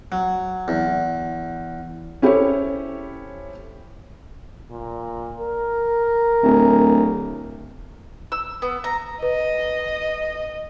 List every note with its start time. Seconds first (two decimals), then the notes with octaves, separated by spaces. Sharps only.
0.12 F#3
0.68 E2
2.22 C#4 E4 G4 A4 C5 C#5
4.70 A#2
5.39 A#4
6.43 D1
8.32 E6
8.62 B3
8.84 A#5
9.23 B4 D#5